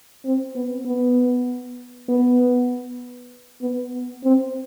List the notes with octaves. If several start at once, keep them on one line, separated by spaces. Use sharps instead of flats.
C4
B3
B3
B3
B3
C4